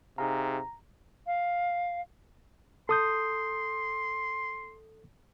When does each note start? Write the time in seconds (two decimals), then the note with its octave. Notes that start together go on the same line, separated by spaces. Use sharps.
0.18 C3 D#4 G#4 F5 A#5
1.27 F5
2.89 A4 C6 D#6 G6